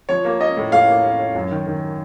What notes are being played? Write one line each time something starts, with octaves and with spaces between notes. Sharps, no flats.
F3 C#5
A#3
C#4 D#5
A2
A2 F5
A#3
C#4
C#4
F#2
D#3
D#3